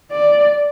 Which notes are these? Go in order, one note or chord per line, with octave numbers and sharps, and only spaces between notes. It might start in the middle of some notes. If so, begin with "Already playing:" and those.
D5